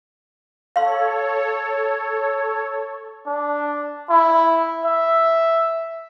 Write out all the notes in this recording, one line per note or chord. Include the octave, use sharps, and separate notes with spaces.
A4 C#5 F5 C6
D4
E4
E5